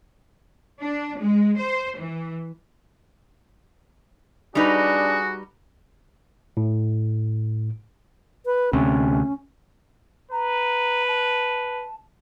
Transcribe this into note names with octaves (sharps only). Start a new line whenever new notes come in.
D4
G#3
C5
E3
G3 D4 D#4 F#4 G#4 B4
A2
B4
D2 C3 C#4
B4 A#5
A5